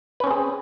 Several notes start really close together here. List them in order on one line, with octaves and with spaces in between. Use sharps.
B4 C#4 C4 G#4